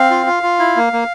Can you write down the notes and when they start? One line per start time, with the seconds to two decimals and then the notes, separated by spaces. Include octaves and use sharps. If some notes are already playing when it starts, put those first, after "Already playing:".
Already playing: C4 F5
0.10 F4
0.26 F4
0.43 F4
0.59 E4
0.76 A#3
0.93 A#3